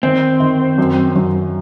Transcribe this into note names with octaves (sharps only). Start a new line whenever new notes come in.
D#3 C4
D#3
F#2
F#2